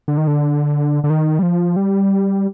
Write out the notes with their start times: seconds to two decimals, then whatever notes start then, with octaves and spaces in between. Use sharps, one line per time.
0.08 D3
0.17 D#3
0.27 D3
1.04 D3
1.10 D#3
1.39 G3
1.43 F3
1.76 G3